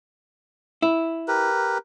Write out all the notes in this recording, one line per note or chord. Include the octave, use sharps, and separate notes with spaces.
E4
G4 A#4 B4